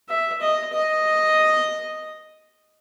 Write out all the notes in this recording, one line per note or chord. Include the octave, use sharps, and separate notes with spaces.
E5
D#5
D#5